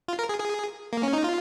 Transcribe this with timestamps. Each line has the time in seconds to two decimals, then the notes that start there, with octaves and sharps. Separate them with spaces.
0.08 F4
0.19 A#4
0.29 G#4
0.40 G#4
0.93 A#3
1.03 C#4
1.13 D#4
1.24 F4